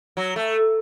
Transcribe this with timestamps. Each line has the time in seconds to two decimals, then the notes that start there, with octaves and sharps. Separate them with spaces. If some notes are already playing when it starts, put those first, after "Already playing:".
0.17 F#3
0.36 A3